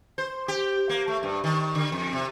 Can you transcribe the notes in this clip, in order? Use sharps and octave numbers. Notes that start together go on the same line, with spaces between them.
C5
G4
A#3
A3
G2
D#3
D3
F2
C3